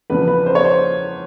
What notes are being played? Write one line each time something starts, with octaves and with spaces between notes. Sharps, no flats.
E2 C#3 F3 B4
B4
C5
C#5
C5